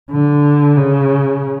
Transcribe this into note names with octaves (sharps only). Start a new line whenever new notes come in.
D3
C#3